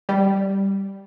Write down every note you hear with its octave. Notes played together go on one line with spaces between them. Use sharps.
G3